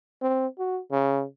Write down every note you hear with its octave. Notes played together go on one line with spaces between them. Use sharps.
C4
F#4
C#3